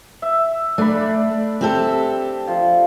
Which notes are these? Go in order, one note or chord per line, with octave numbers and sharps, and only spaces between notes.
E5
A3 D4 D5 B5
C4 G4 A4
F3